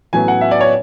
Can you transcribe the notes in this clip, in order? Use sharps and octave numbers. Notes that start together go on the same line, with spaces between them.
A1 A2 F#3 B3 G#5
F#5
E5
D5
C#5